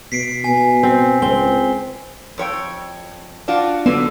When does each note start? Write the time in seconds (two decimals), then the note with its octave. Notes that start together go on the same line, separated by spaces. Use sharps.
0.12 B2 B6 C7 D7
0.44 B2 G#5
0.83 C4
1.22 C#2 C4 G7
2.38 F2 C#5 G5
3.48 D4 F4 F#4
3.86 D3 F#3 B3